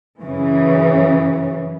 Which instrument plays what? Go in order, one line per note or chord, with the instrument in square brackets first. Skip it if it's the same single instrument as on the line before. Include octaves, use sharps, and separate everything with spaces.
[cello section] F#2 C#3 E3